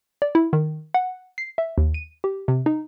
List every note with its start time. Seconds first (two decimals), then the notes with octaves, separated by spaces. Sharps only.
0.22 D5
0.35 E4
0.53 D#3
0.94 F#5
1.38 C7
1.58 E5
1.78 D#2
1.94 D#7
2.24 G4
2.48 C3
2.66 D#4